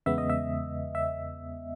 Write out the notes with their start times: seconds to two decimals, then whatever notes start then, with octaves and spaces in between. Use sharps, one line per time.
0.06 E2 C#3 G#3 B3 E5
0.18 D#5
0.30 E5
0.95 E5